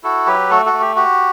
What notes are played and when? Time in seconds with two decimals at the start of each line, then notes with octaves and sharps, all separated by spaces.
0.03 E4 F#4 A4
0.26 F#3 G4 B4
0.50 A3 F#4 A4
0.65 F#4 A4
0.73 A3
0.81 G4
0.96 F#4 G4